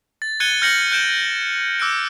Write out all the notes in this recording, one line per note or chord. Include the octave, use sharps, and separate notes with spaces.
A6
F#6 G#6 A6 C#7 D#7 G7
F6 G6 G#6 A#6 C#7 F#7
F#6 G6 D7 E7
D6 E6 F#6 C#7 D7